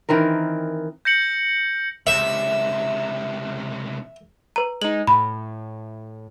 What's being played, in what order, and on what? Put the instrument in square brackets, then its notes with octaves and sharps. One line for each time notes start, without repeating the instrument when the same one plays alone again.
[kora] D#3 E3 C4 A#4
[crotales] G6 A#6 C#7 F#7
[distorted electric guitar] C#2 C3 [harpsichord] E5
[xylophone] B4 A#5
[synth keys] G#3 D#4 [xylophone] F#7
[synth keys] A2 [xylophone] B5